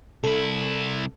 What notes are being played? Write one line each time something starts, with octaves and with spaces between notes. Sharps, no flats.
C2 E4 A4